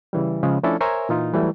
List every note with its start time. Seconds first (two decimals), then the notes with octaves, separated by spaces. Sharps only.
0.13 C#3 E3 G3
0.43 C#3 F3 G#3
0.63 F3 A3 C#4 D4 E4 A4
0.81 A#4 C5 C#5 E5 G#5 A#5
1.09 A#2 E3 D#4 F4
1.34 E3 F#3 G3 A3